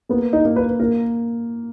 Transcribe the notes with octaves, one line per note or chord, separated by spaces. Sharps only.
A#3 B3
D#4
A#3
B4
A#3 A#4